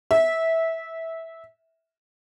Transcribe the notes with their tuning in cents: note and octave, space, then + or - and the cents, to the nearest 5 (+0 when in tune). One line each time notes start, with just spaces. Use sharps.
E5 -15